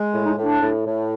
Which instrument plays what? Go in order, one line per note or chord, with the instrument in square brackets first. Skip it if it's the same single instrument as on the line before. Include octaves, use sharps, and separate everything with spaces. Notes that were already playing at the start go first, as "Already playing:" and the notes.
Already playing: [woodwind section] G#3
A2
D#4
A2
D4
A2
A2